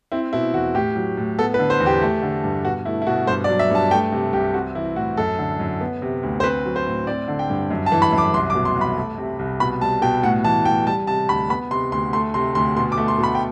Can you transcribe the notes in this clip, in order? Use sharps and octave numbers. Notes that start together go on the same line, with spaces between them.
C4 E4
B2 E4
E2 F#4
A2 G4
F#3
A2
B3 A4
B4
D3
C5
E2
G4
A3
D3
G2
B2 F#4
A3 E4
E4
B2 F#4
G2 C5
D5
F#3
E5
G2 A5
A3 G5
C3
C2 G4
C4 F#4
E3 E4
A2 F#4
F#2 A4
D3
F#2
B3
C3
D2
C5
C4 B4
F#3
C5
A2
C4 D5
D3
G5
G2
F#2
A5
E3
B5
F#2
D6
C2 C6
D6
B2
C6
C2
B5
A3
C3
C2
B2 B5
G3 A5
B2 G5
A2 F#5
E3 A5
A2 G5
G3 A5
C3 A5
D2 B5
B3 B5
C3 C6
D2 C6
A3 C6
C3 C6
D2 C6
B2 C6
D6
A3
C6
B2
B5
G5